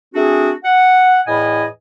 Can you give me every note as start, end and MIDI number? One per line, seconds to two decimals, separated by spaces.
0.15 0.51 57
0.15 0.51 60
0.15 0.51 62
0.15 0.51 66
0.15 0.51 68
0.64 1.20 78
1.27 1.66 40
1.27 1.66 45
1.27 1.66 75
1.27 1.66 80
1.27 1.66 83